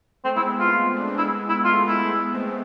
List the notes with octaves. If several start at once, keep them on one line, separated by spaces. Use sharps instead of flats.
A3 C4
G#3 B3 E4
G#3 B3
A3 C4 F4
D4
C4
G#3 B3 E4
E4
G#3
A3 F4
G#3
A3 E4
G#3 B3
A3 C4
C4